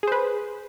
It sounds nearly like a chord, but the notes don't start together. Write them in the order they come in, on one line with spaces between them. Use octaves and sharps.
G#4 C5 B4